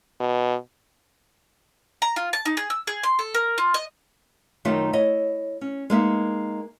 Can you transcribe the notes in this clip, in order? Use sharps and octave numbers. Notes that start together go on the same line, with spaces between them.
B2
A#5
F4
A5
D#4
G#4
E6
G#4
C6
A4
A#4
F4
D#5
F#2 D#3 A3 D#4 F4 E5
E4 C#5 D#5
C#4
G#3 A#3 D#4 E5